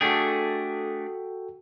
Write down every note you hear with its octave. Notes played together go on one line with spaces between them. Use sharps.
A3 D4 F#4 G#4 A4 G5